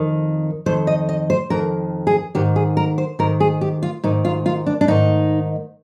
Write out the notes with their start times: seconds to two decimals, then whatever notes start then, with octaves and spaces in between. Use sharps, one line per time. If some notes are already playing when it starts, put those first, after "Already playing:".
Already playing: F2 D#3
0.66 F2 D#3 C5
0.87 D#5
1.09 D#5
1.30 C5
1.50 F2 D#3 A#4
2.07 G#4
2.35 G#2 D#3 G4
2.56 G#4
2.77 A#4
2.98 C5
3.19 G#2 D#3 A#4
3.40 G#4
3.61 G4
3.83 F4
4.03 G#2 D#3 D#4
4.25 F4
4.46 F4
4.66 D4
4.81 D4
4.88 G#2 D#3 D#4